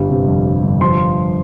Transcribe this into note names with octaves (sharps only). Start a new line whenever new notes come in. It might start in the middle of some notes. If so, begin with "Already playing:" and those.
Already playing: G1 G3
C3
F2
G3
G1
F3 C6